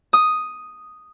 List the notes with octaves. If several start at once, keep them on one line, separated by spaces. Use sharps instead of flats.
D#6